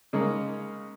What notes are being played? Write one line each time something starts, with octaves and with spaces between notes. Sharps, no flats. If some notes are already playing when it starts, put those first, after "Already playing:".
C#3 G#3 A#3 D#4 G#4